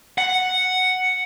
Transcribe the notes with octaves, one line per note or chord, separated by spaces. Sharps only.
F#5